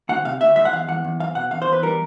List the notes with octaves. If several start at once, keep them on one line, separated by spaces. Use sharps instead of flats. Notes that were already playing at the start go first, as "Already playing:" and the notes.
D2 F#5
C3 F5
D2 E5
G#3 E5
F#5
E2 F5
E2 F#5
E2
E2 F5
B2 F#5
E2 F5
C5
E2
B4
G3 A#4